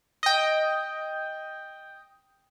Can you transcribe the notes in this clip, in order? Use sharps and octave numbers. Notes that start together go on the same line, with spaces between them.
D#5 G5